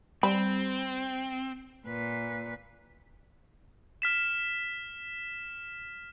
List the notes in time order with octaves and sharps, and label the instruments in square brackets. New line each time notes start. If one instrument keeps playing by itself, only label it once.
[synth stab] G3 [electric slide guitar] C4 [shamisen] B5
[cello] A#2 B4
[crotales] F6 B6 E7